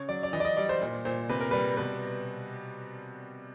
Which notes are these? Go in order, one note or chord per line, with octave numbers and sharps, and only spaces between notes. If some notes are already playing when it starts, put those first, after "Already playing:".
Already playing: C#3 C#5
F#3 D5
D5
E3 D#5
D5
D#5
G3 D5
C5
A#2
A#2 C5
C3 B4
A#4
G3 B4
B2 B4